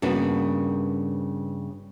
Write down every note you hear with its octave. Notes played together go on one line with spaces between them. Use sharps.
G2 C#3 A#3 B3 F#4